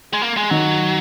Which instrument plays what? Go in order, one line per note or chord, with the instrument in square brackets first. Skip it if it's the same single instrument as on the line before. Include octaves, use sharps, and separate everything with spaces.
[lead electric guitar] G#3
A#3
G#3
[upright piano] D#3 [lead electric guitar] F#3